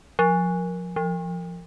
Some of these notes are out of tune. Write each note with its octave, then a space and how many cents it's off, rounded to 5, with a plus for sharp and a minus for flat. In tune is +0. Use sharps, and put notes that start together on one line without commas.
F3 +30
F3 -15